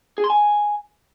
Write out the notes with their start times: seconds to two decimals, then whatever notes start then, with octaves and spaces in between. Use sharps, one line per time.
0.18 G#4
0.24 C6
0.30 G#5